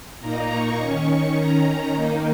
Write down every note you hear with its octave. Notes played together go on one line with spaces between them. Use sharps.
A#2 A#3 D#4 A#5
C#6
D#3 C#4
D#3 C#4 A#5
D#3 A#3 D#4